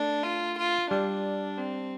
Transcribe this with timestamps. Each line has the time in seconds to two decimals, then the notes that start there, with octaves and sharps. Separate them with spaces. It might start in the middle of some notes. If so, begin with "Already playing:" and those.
Already playing: A3 D4
0.23 F4
0.58 F4
0.91 G3 D4
1.58 C4